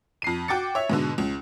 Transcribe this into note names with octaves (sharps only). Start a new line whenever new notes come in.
F2 C7 D#7
F#4 G5 D6 A6 C#7
C#5 E5
G#2 B2 D3
C#2